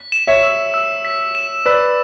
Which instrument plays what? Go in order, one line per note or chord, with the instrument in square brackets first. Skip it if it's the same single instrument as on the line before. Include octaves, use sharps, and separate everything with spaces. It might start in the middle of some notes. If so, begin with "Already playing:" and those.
Already playing: [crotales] B6
E7
[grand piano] C#5 E5
[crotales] E6
E6
B6
E7
[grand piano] B4 D5 [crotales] E6